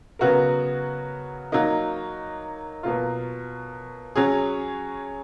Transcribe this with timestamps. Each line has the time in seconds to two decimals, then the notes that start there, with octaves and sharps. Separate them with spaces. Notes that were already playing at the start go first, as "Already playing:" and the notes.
0.19 C#3 F#3 B3 F#4 A#4
1.52 F#3 A#3 D#4
2.83 B2 F#3 A#3 F4
4.16 F#3 C#4 G#4